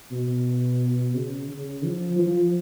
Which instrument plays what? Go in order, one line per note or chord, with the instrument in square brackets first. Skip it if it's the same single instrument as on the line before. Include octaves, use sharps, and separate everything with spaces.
[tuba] B2
C#3
C#3
F3
F3